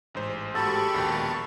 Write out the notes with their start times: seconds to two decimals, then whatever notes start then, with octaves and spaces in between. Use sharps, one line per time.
0.15 A1 G#2 C5
0.55 G#3 G4 A4 A5 B5 C#6
0.94 A#1 D#2 B2